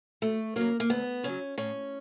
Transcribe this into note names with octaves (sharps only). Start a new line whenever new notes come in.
D2 A3
C#3 F#3 A#3
A#3
D2 B3
C#3 F#3 C#4
A2 C#4